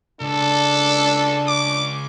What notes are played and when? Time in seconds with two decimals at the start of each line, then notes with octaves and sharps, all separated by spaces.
0.21 C#2 D4 A4
1.47 D6